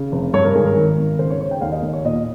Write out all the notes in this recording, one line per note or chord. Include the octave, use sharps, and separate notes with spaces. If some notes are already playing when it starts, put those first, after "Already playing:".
Already playing: C#3
F1
G2 C#5
A#4
G#1 G#4
A#4
D#3
G#1
C#3 C5
C#5
C#3 C#5
G5
D#2 F5
D#5
D#2
C#5
A#2 D#5